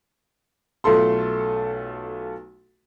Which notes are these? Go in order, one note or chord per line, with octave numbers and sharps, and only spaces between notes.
B1 A3 F4 A4 C6